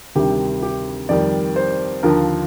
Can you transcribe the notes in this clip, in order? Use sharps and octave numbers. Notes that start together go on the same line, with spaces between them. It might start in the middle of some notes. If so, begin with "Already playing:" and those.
D2 C3 D#3 G3 G4
G4
F2 D#3 G3 D5
C5
D#2 D3 F3 A#4